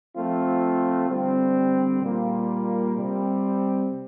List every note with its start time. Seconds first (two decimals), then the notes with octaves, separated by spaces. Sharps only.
0.15 F3 A3 C4 F4
1.08 D3 G3 C4
2.01 A#2 G3 A#3 F4
2.94 C3 G3 C4